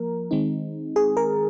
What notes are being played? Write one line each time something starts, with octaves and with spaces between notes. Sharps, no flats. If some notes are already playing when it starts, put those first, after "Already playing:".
Already playing: F3 A#3 A#4
D#3 G#3 C4 D#4
G#4
A#4